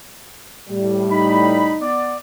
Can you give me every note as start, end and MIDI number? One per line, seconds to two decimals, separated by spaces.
0.69 1.76 45
0.69 1.76 55
1.11 1.86 63
1.11 1.73 83
1.81 2.18 59
1.81 2.18 74